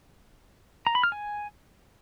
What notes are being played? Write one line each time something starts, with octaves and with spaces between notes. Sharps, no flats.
A#5
B5
F6
G#5